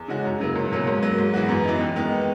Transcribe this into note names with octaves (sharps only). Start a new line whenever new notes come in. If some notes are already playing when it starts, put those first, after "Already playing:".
Already playing: E2
C#3 G#3 C#4 F#4
F#2
C#3 F#3 A#3 E4
C#2
B2 F#3 A#3 C#4
G#2
F#3 A#3
G#2
E3 B3 F#4
F#2
E3 B3 D#4
D#2
D#3 G#3 B3 D#4